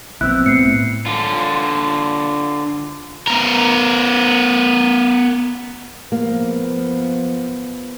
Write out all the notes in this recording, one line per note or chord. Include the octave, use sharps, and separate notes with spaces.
B1 B3 C4 E4 E6 F#6
A2 C7 C#7
D3 F4
B3 A#4
F3 A#3 B3